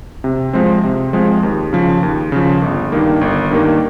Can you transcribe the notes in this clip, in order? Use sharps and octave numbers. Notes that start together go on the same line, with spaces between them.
C3
F3 G#3 C4
C3
F3 G#3 C4
D#2
C#3 F3
D#2
C#3 F3
G1
G2 D#3 A#3
G1
G2 D#3 A#3